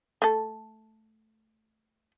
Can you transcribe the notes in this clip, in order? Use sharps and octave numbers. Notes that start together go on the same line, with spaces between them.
A3 A4